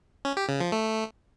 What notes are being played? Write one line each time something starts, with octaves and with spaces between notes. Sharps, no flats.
C#4
G4
C#3
F3
A3